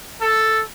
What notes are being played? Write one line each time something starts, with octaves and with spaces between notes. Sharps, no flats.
A4